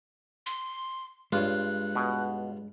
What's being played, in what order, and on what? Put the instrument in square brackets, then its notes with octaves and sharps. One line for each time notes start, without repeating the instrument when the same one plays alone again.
[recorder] C6
[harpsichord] G2 F4 [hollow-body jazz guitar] G#3 D4 C#5 [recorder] F#6
[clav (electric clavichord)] B2